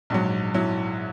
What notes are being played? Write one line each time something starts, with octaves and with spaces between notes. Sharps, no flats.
A#1 G#2 F#3
F#3 E4